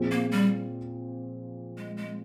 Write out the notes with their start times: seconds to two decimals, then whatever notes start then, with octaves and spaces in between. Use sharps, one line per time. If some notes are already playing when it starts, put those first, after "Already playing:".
Already playing: A#2 F3 C4 F4 G#4
0.11 A#3
0.32 G3
1.78 G#3
1.97 G#3